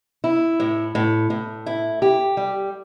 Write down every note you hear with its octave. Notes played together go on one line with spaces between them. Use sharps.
E4
A2
A2
A2
E4
G4
G3